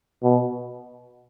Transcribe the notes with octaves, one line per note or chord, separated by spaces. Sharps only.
B2